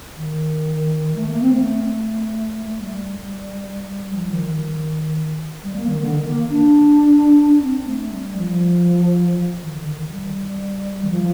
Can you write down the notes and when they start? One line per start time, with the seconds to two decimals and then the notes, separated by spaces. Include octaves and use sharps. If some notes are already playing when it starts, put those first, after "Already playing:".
0.16 D#3
1.16 A3
1.28 A#3
1.41 C4
1.53 A3
2.65 A3
2.82 G3
2.98 G3
4.14 F3
4.31 D#3
4.47 D#3
5.63 G3
5.76 A#3
5.88 D#3
6.01 D3
6.14 D#3
6.25 A#3
6.50 D4
7.54 D4
7.62 C4
7.87 A3
8.12 G3
8.37 F3
9.62 D#3
9.73 D3
9.86 D#3
9.98 D#3
10.11 G3
11.04 D#3
11.10 F3